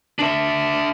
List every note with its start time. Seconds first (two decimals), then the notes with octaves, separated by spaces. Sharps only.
0.19 D4 E5